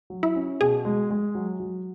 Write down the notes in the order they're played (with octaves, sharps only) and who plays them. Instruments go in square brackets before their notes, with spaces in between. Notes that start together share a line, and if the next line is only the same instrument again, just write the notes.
[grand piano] F#3
[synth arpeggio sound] E4
[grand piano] C#4
[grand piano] B2 [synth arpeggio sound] G#4
[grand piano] G#3
G#3
F#3
F#3